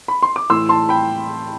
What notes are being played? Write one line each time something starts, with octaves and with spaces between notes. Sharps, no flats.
B5
C6
D6
A2 E3 C6 E6
A5 C6
G5 B5